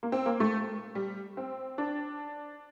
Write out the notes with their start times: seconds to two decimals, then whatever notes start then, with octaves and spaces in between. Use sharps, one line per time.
0.03 A#3
0.12 C4
0.26 A#3
0.40 A3
0.95 G3
1.37 C4
1.78 D4